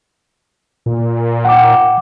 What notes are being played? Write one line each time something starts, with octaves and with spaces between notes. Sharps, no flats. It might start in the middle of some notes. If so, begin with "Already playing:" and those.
A#2
F#5 G5 D6